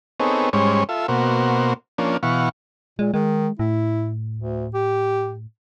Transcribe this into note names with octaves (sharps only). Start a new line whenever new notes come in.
B3 C4 D#4 G#4 A4 C#5
G#2 G3 G#3 C#4 C5 C#5
F4 A4 E5
B2 A#3 F#4 C5
F3 A#3 C#4 D4
B2 E3 F5 F#5 C#6
A#2 G#3
D#3 G#3
A2 E4
D2
G4